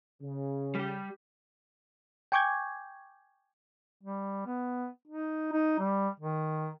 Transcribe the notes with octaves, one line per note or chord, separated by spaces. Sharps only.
C#3
G3 G4
G5 G#5 C#6 D6 G6 G#6
G3
B3
D#4
D#4
G3
D#3